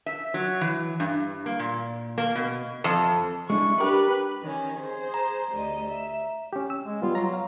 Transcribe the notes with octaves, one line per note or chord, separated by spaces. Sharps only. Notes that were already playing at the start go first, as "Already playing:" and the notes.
E5
F#3
E3
G2
A#3
A#2
A#3
B2
F2
G#3 D4 E4 C#6
D4 G4 A#4 B4
D#3 C#4
G#4 C5
A#5
D2 G3 D#5
E5
C#4 G4
E6
G#3
G3 B3 F4
F#3 A#5 C6
F5